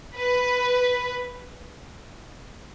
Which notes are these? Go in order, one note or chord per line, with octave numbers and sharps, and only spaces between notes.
B4